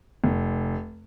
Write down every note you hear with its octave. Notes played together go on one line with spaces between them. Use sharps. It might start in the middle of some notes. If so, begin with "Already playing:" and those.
F1